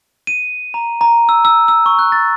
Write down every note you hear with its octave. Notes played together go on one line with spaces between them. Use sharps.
D#7
A#5
A#5
E6
E6
E6
C#6
F#6
A6